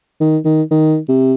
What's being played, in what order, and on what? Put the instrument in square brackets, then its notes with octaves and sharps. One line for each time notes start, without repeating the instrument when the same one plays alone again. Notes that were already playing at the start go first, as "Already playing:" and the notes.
[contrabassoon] D#3
D#3
D#3
C3